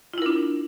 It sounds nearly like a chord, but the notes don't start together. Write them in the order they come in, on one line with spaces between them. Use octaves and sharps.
F4 E4 A#4 D4